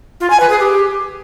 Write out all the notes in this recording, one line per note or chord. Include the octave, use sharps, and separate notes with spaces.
F4
G#5
B4
G#4
G4